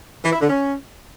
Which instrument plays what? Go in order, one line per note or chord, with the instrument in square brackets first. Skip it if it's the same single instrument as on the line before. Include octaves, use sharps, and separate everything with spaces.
[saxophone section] E3
E4
D3
C#4